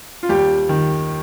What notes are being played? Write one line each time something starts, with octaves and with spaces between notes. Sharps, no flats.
F4
D#2 G3 G4
D#3